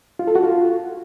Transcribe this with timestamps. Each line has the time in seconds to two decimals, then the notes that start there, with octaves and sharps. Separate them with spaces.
0.19 F4
0.27 A4
0.35 F#4
0.44 F4